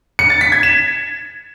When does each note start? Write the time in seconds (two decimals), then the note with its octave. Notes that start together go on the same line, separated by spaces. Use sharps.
0.19 C#7
0.30 A6
0.41 B6
0.52 G#6
0.63 E7